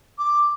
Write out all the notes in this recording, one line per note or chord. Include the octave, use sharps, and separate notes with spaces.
D6